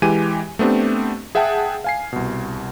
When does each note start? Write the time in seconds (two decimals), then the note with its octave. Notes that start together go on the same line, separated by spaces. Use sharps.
0.02 E3 G#3 G4 G#5 D#7
0.59 A3 B3 C4 D4 G4
1.35 G#4 E5 F#5 G5 A5
1.84 F5 G#5 C7
2.13 C2 B2